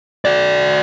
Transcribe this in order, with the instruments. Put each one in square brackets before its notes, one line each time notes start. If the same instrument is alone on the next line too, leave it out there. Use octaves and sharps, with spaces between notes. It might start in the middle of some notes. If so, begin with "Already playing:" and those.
[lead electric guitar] F#4 D5